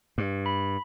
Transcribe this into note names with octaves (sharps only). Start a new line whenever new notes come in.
G2
B5